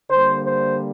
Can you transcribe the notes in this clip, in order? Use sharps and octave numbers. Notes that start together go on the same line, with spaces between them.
D3 G3 A#3 C5
C5